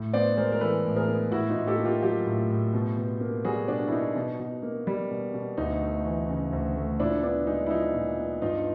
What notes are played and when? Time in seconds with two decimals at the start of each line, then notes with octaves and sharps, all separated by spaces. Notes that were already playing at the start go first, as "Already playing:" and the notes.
Already playing: A2
0.13 B3 C5 D5
0.37 G#3 A#4 C5
0.52 A#4
0.61 E3 A4 B4
0.85 A2
0.96 G#4 A#4
1.08 B3
1.32 A2 E4 F#4
1.50 D#4 F4
1.56 A2
1.67 G4 A4
1.79 A#3
1.85 F4 G4
2.03 F#3 F4 G4
2.27 A2
2.50 A2
2.74 B2
2.98 B2
3.21 A#3
3.45 G3 F#4 G#4
3.68 B2 D4
3.88 E4
3.92 B2 D#4
4.16 B2
4.40 B2
4.63 A#3
4.87 G3
5.11 B2
5.34 B2
5.57 D2 D#4
5.81 A3
6.05 E3
6.29 C#3
6.53 D2
6.76 A3
7.00 A#2 D4 E4
7.23 B3 D4
7.47 G#3 D#4
7.66 E4
7.71 F3 D#4
7.94 A#2
8.18 B3
8.42 G2 D#4 F4